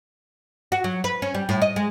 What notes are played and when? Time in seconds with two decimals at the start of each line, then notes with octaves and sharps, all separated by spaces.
0.72 F#4
0.84 F#3
1.04 B4
1.22 C#4
1.34 G3
1.49 A2
1.62 D#5
1.76 G#3